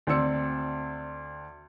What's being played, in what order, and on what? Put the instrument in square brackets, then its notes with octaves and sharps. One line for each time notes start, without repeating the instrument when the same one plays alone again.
[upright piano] D2 C4 D5 E6 C#7